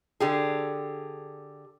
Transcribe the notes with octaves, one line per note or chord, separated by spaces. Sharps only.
D3 G4 G#4